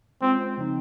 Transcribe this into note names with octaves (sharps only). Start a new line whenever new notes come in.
G#3 C4 C#4 F4
C#3 F3 C4 D#4